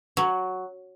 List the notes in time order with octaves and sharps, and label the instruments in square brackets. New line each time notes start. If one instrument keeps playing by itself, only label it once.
[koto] F#3